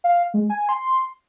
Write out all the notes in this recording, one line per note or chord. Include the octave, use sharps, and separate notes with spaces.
F5
G#3
G#5
C6